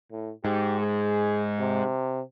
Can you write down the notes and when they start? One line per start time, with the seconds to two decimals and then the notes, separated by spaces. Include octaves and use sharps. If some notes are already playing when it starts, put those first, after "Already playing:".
0.11 A2
0.45 G#2 G4
0.81 G#4
1.59 C3